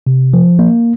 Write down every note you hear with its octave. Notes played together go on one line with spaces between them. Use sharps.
C3
F3
A#3